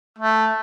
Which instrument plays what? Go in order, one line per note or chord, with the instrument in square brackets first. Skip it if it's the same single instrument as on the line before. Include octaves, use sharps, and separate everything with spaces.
[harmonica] A3